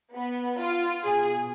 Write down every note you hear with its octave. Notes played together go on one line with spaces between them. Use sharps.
B3
F4
B2 G#4